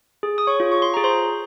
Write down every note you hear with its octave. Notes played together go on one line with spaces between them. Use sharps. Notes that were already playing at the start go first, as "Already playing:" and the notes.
G#4
D#6
C#5 C#6
F4
C#6
C6
G#4 A#5
C5 C6